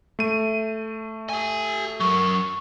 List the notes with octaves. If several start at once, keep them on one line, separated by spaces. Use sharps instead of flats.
A3 D#7
G4 G#5
F#3 A#4 C#6